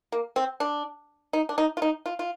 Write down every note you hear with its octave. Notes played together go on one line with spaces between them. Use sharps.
A#3
C4
D4
D#4
D4
D#4
F4
D#4
F4
F4